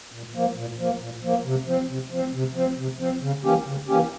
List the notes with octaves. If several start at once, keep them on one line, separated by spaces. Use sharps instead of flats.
A#2
F3 A#3
A#2
F3 A#3
A#2
F3 A#3
C3
F3 C4
C3
F3 C4
C3
F3 C4
C3
F3 C4
C#3
E3 A#3 C#4 G4
C#3
E3 A#3 C#4 G4